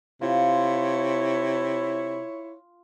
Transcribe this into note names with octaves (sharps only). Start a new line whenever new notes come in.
C3 E4 F4 C#5